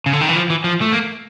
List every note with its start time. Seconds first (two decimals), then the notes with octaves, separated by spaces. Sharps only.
0.06 C#3
0.13 D3
0.21 D#3
0.29 E3
0.36 F3
0.50 E3
0.64 F3
0.81 A3
0.92 A#3